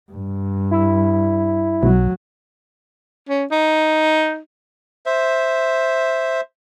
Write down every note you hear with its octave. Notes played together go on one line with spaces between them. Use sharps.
G2
E4
B1 F#3
C#4
D#4
C5 E5